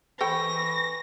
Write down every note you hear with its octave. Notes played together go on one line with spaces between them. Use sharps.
E3 A4 C5 G5 B5 C#6 A#6